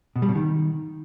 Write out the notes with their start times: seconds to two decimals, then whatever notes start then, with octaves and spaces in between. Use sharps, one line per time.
0.16 B2
0.22 G3
0.29 B2
0.35 D#3